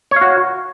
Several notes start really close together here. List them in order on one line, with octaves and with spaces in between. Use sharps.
C#5 F5 F#4